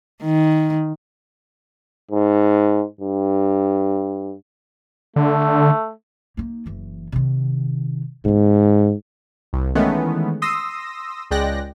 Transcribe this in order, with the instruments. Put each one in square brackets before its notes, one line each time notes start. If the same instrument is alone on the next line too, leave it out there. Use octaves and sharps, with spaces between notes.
[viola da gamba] D#3
[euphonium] G#2
G2
[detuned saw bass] D3 [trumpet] A3
[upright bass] A#3 D#4
F#1 E3
C3 D#3
[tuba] G#2 [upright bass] D3 B3
[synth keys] C2
D#3 E3 G#3 A3 B3 C#4
C6 D#6 E6 A#6
C#2 G#3 D5 G5 F#6 A#6